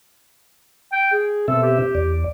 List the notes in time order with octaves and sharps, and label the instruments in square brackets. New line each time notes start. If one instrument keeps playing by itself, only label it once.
[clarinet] G5
G#4
[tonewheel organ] B2 C4 E5 [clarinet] A4
[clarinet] G4
[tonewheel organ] E2 D5